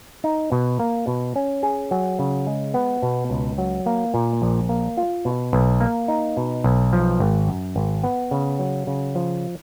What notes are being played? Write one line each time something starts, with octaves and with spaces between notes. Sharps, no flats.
D#4
B2
A#3
B2
C#4
G#4
F#3
C#3
G#3
B3
B2
C#2
F#3
A#3
A#2
A#1
A#3
F4
B2
B1
A#3
D#4
B2
B1
F3
G#1
F#2
G#1
B3
C#3
F#3
C#3
F3